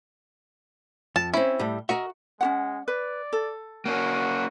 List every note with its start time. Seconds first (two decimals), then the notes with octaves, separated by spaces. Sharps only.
1.16 F2 A5
1.34 C4 C#4 E4
1.59 A2 G3
1.89 F#4 A#4 D#5 E5
2.41 G#3 C#4 F#4 F#5
2.88 B4 D5
3.33 A4
3.86 A#3 C#4 F#4